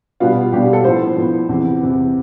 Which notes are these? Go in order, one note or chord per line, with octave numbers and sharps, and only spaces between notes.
B2 G3 B3 D4 F4
B2 G3 B3 D4 G4
G4
A4
A2 F3 B3 C5
A2 F3 B3
E2 C3 E3
E2 C3 E3